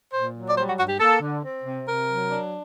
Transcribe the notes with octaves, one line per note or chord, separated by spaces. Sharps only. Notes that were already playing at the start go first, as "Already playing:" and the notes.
A#2 C5
F#3
D5
G3 C5
F#4
G2 F#4
G4
A#3 A4
D3
C4
C3
C3 A#4
F#3
D4